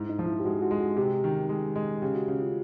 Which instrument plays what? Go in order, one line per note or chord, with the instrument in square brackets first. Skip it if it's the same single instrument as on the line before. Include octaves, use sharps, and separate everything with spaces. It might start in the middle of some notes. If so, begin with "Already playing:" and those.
Already playing: [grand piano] G#2 [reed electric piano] E4
[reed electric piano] D#4
[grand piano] F3
[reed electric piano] E4
G4
[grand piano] G#3 [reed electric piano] F#4
[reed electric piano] F#4
[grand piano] G#3
[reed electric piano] F#4
[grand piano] C3 [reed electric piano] G4
[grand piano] D#3
G#3
G#3
[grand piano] C#3 [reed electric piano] G4
[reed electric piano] F#4
[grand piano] C#3 [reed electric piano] F#4
[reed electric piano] F4